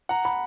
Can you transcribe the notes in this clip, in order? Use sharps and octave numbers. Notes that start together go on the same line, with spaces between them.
F#5 A#5
B5